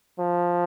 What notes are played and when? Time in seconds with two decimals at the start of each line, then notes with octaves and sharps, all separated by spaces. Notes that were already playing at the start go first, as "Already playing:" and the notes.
0.19 F3